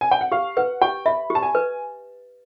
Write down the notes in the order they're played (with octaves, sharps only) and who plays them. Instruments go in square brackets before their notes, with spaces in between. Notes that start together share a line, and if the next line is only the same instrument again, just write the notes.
[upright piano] G#5
G5
F#5
[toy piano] G4 [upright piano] F5
[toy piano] B4 [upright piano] F#5
[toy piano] G4 [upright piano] G5
[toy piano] E5 [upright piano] B5
[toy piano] G4
[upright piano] A5
G#5
[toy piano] B4